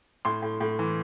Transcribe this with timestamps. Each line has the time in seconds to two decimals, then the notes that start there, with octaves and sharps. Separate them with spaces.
0.25 A2 C6
0.42 A2
0.61 A2
0.79 E3